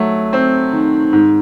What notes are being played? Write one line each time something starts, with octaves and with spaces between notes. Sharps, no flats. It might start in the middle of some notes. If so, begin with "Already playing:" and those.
Already playing: F#3 A3
C4
D#3
G#2